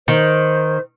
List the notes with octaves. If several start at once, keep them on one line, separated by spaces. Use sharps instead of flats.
D#3 C5